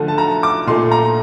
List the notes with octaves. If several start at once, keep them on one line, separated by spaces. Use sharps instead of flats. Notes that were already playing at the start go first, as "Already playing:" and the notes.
Already playing: D3 F3 A3
A5
A#5
D6
A#2 A3 C6
A#5